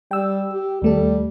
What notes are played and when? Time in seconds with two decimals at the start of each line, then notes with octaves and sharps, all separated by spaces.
0.11 G3 G5 E6
0.52 G4
0.82 D#2 G3 A3 A4